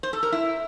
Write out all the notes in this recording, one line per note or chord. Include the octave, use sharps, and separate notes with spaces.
C5
A4
A#4
E4